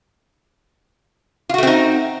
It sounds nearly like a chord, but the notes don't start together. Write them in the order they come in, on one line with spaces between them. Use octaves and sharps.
F4 F#4 A3 C4 D#4